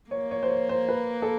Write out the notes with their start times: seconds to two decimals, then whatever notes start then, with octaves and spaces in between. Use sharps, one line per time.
0.11 A#3 C#5
0.31 C#5
0.43 C5
0.50 C#5
0.69 C5
0.88 B4
1.22 A4